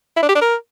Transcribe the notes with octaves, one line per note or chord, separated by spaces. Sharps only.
E4
D4
G4
D4
A#4